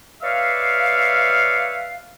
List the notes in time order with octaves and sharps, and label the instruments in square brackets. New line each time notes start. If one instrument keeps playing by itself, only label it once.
[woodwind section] B4 C#5 D5 E5 F5